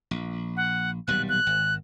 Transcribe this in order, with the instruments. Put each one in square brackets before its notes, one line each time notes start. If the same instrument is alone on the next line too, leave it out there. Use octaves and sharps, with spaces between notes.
[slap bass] A#1
[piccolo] F#5
[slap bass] D#1 B1 G3 [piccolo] F#6
[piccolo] F#6
[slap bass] G#1